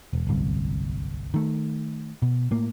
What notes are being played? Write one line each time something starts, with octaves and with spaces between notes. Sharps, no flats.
E1
D1 G1 C2
D#3 A3
B2
A2 A#3